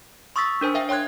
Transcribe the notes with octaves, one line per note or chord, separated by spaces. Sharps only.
C6 C#6 D#6 E6 A6 B6
D4 A#4 C5 G#5
A#4 E5 F5 G5
C#5 G5 C6 F#6 G#6